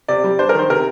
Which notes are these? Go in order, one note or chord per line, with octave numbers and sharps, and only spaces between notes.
C3 D5
G3
D4 C5
A#4
D#3 C5
C3 A#4